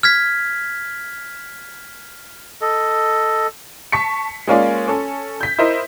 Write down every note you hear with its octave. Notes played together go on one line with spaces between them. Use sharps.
F6 G#6 B6
A4 D#5
A5 C#6 B6 C#7
G#3 A#3 C#4 F4 D5
C#4 A4
G6 B6
E4 A#4 C5 D#5 E5